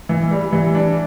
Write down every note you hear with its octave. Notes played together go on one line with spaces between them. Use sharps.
E3
G3
E3
D4